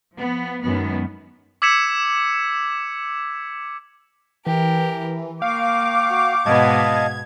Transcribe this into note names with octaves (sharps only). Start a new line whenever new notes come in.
F3 B3
F#2 D#3 G#3 B3
D6 E6 G#6 B6 C#7 E7
E3 G4 A#4
A#3 F5 G5 C#6 D6
F#4
G#2 B2 B3 D#5 F5 A5 G#6